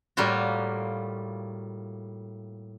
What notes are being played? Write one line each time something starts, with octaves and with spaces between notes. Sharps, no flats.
A2 G3 A#3 F4 F#4